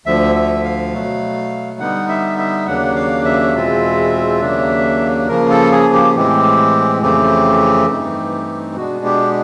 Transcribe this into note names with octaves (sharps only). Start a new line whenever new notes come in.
D2 D3 F3 E5
E5
F5
B2 F#3 A3
D3 G3 B3 D#4 F#5
E5
E5
D#2 C#3 F#3 A#3 D4 F#5
F5
E5
E2 B2 G#3 C4 F4
D#2 C#3 F#3 A#3 D4
C#3 F3 A#3 A#4
A4
G#4
G4
A2 E3 G#3 C4 G4
F2 C#3 E3 A3 C4 G4
G2 E3 A3 C4 D#4
B2 G#3 B3 D4 F#4
G4